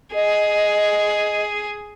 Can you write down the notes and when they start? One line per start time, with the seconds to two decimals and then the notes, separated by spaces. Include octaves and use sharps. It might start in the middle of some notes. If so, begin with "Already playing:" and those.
0.14 G#4 D#5